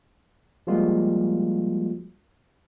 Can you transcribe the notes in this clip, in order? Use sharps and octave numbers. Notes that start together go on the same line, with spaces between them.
F3 G3 G#3 A#3 F4 F#4